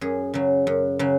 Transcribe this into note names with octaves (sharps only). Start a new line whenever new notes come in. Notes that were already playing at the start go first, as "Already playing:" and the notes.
F#2 G#4
C#3 F#3
F#2
C#3 F#3